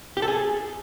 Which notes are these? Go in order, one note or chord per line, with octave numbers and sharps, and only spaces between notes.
G4
A4
G#4